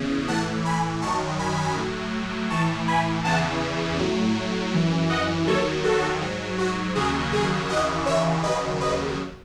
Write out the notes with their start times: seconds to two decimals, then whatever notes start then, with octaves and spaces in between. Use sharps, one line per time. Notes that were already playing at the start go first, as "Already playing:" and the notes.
Already playing: E2 C#3
0.27 A2 E3 F#5 A5
0.65 G#5 B5
1.02 F#2 D#3 F#3 A5 C#6
1.39 G#5 B5
1.76 A2 F#3
2.50 A2 E3 A5 C#6
2.88 G#5 B5
3.24 E2 C#3 E3 F#5 A5
3.98 A2 F#3
4.72 F#2 E3
5.09 D#5 F#5
5.47 D#2 D#3 F#3 A4 C#5
5.84 F#4 A4
6.21 G#2 F#3
6.58 F#4
6.95 D#2 C#3 F#3 G#4
7.33 G#4
7.69 D#2 C#3 E3 D#5 F#5
8.06 C#5 E5
8.43 D#2 C#3 F#3 B4 D#5
8.80 B4 D#5